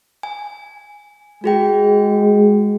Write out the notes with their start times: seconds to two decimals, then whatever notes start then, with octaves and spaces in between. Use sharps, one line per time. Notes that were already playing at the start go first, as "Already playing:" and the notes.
0.23 G#5
1.44 G#3 F#4 G#4 G5